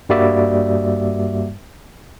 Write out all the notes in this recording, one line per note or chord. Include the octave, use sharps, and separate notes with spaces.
G2 G3 A#3 F#4 D5 E5